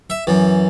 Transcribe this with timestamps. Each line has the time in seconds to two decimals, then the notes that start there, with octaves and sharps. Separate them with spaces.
0.10 E5
0.27 F#2 E3